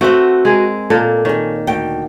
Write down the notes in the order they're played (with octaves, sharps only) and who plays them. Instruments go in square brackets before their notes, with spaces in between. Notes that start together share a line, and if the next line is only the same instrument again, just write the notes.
[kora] A3 C4 B4 [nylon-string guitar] F#4 F#5
[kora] G#3 G#4 A#4
[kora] A#2 A#3 [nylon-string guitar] A4
[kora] D#3 [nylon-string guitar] G#4 C#5
[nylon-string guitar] D2 G5